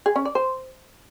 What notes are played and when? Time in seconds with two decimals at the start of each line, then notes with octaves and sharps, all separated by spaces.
0.06 G#4
0.16 C#4
0.25 D5
0.35 C5